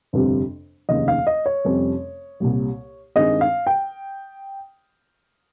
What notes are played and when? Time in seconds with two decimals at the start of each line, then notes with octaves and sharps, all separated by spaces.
0.13 G1 F2 C3 G3 C4
0.89 F1 D#2 C#3 D#5
1.08 F5
1.27 D#5
1.46 C#5
1.65 F1 F2 C3 G3 C#4
2.40 C2 A#2 G3
3.16 G2 D#3 G#3 C4 D#5
3.41 F5
3.67 G5